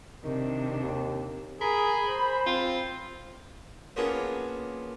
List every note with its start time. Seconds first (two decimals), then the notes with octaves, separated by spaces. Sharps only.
0.24 C3 D#3 D4
0.83 D#2
1.61 G#4 A#4 B5
2.09 C5
2.46 C4 F4
3.96 A#3 B3 C#4 D4 F4 G#4